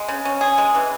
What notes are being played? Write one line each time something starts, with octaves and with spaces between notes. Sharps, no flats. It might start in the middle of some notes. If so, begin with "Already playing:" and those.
Already playing: G#3
C#3
C#4
G#4
G#3
E3